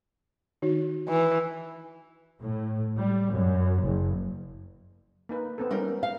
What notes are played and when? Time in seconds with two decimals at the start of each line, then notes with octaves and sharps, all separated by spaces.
0.62 D#3 D#4 F#4
1.08 E3
2.41 A2
2.97 G3
3.32 F#2
3.82 F#1
5.29 A#3 D#4 B4
5.58 B3 C4 A4
5.71 G3 C#4 D#4 A#4
6.03 F5